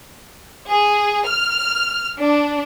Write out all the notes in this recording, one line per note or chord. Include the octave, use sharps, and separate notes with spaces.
G#4
F6
D4